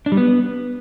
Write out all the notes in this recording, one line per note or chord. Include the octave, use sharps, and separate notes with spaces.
D4
G3
B3